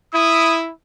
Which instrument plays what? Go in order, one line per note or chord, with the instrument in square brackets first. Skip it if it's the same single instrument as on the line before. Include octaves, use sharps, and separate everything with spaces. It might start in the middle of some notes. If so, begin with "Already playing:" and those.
[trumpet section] E4 [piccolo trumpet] D#6